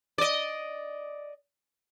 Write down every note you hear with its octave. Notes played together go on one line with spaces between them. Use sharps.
D5 D#5